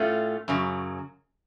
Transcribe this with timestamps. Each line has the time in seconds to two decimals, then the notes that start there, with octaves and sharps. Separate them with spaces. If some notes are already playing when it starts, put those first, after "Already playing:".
Already playing: A2 A3 C#4 F4
0.48 F#2 C#3 F#3